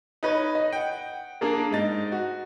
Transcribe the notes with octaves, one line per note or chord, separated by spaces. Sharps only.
D#4 B4 C#5
D#5
F#5 G5
A#3 D4 G#4 A#4
G#2 D#4 A6
F#4